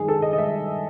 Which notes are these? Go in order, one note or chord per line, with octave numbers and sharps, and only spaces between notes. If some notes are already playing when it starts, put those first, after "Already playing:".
Already playing: G2 D#3 G#3 G#4
A4
D#5
D#5
G#3 E5